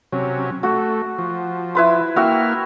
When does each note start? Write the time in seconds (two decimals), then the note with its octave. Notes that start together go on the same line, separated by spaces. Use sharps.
0.12 C3 F#3 C#4
0.63 A3 F#4
1.18 F3
1.75 E4 B4 C6
2.16 A#3 E4 F#4 E5 G5 F6